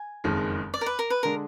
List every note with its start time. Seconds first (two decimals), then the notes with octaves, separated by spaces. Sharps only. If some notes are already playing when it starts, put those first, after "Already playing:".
Already playing: G#5
0.24 F#1 F2 D#3 G#3
0.74 D5
0.81 A#4
0.86 B4
0.99 A#4
1.10 B4
1.23 D3 G#3 D4 A#4